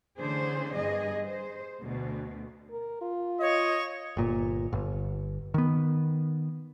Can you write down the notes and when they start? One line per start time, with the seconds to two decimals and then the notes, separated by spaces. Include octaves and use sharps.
0.19 D3 E3 A3 C#4 G#4 C5
0.74 G2 G3 B3 G#4 D#5
1.25 C5
1.82 D2 B2
2.71 A#4
3.02 F4
3.41 C#5 D#5
4.17 G1 A#2
4.73 G1
5.54 D#3 B3